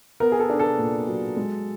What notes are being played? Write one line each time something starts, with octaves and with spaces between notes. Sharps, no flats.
B3 A#4
G#4
A4
D4
A4
A#2
F#3
G#3